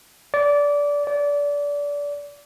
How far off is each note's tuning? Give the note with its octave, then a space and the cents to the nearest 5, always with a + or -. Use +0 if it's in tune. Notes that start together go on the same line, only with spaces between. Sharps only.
D5 -20
D5 -25